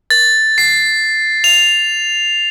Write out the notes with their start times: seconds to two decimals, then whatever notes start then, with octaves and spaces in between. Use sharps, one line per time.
0.10 A6
0.58 C7
1.44 F7